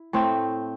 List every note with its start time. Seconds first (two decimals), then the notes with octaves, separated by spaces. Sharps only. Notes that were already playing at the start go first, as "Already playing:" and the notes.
Already playing: E4
0.13 A2 A3 C4